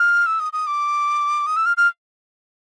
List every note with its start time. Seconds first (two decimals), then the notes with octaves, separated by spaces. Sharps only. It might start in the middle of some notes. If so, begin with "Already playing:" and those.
Already playing: F6
0.26 E6
0.40 D#6
0.53 D#6
0.67 D6
1.47 D#6
1.56 E6
1.66 F6
1.77 F6